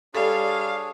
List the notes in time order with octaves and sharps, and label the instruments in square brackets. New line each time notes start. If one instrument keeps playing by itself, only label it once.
[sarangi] G3 [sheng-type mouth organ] D4 G#4 C#5 [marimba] A4 [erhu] F5